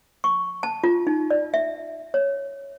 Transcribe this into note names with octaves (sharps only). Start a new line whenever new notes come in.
C#6
A5
F4
D#4
D5
E5
C#5